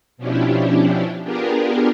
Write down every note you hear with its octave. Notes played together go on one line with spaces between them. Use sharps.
B2 F3 C#4 D4 E4 G4
B3 D4 F4 G4 G#4 A#4